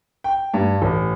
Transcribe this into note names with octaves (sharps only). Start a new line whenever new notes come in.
G5
G2
A1